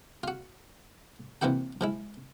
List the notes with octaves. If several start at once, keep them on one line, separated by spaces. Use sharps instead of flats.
F4 F#4
C3 E3 A#3 E4 F#4 G5
F3 G#3 E4